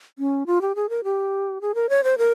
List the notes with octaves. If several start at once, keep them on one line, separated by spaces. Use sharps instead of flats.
C#4
F4
G4
G#4
A#4
G4
G#4
A#4
C#5
C5
A#4